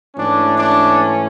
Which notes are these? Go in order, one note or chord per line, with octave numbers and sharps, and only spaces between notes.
G#2 E3 A3 C#4 D4
D4